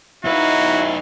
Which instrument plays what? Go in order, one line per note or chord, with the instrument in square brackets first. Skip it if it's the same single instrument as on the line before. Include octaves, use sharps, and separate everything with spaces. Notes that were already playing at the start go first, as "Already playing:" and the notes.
[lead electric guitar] F#2 B4 [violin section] D#4 F5 [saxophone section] E4 [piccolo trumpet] F#4